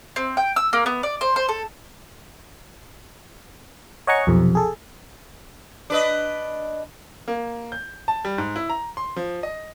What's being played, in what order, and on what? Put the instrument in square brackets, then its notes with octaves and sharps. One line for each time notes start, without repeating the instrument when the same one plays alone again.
[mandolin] C4
G5
E6
A#3
B3
D5
C5
C5
A4
[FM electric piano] C#5 D#5 F#5 G#5 A#5 C#6
B1 F2 C3
G#4 A4
[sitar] D4 B4 D#5
[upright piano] A#3
G6
A5
G3
G#2
E4
A#5
C6
F3
D#5